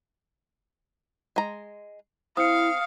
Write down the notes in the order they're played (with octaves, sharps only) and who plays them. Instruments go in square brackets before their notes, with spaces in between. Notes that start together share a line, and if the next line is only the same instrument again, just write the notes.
[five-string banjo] G#3 A#5
[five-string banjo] C4 [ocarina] E4 [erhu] F5 [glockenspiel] D#6 C#7